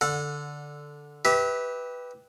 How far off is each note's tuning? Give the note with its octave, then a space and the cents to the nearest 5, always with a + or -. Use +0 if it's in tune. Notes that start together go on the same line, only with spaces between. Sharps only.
D3 +0 A4 +5 F#5 -30
G4 +0 B4 +0 E5 -35